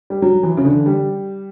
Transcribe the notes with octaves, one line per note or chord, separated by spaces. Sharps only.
G3
F#3
E3
C#3
D3
G3